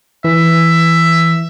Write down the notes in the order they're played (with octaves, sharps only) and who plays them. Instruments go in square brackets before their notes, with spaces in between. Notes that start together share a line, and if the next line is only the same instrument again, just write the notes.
[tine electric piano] E3 [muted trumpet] E5